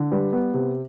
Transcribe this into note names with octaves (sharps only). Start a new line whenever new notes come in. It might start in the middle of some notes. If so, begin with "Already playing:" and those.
Already playing: D3
G3 B4
B3
C3